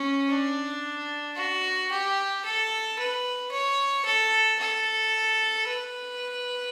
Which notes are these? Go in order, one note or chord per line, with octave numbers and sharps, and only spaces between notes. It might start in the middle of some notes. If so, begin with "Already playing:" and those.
Already playing: C#4
D4
F#4
G4
A4
B4
C#5
A4
A4
B4